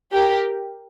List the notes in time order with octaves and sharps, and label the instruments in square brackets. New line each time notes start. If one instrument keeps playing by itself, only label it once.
[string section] G4 A#4